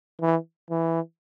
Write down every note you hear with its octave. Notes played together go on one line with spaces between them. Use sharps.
E3
E3